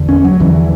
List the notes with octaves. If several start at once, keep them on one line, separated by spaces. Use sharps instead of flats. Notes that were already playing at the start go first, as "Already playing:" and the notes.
Already playing: E2 D3
C#4
F#3
E2 D3 E3